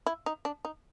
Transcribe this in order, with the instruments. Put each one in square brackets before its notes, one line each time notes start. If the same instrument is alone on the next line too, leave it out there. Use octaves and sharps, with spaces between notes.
[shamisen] E4
D#4
D4
D#4